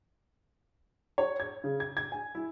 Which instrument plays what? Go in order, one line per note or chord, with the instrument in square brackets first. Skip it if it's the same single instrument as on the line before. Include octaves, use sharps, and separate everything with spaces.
[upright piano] C#5
G#6
C#3
G#6
G#6
G#5
E4